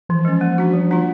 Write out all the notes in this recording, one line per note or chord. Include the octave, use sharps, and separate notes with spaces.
E3 F3
G#3 C#4
A#3
D4 F#4
G3
A#3 D4 F4